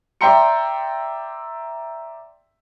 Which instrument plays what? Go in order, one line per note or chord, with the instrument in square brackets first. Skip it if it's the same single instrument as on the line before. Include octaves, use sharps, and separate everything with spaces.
[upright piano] D5 E5 G5 A#5 C6 C#7